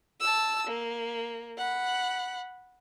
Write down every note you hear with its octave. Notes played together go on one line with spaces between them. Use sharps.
A5 E6
A#3
F#5 B5